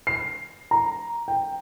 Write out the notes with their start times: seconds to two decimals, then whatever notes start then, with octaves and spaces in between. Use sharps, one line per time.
0.07 C7
0.71 A#5
1.28 G5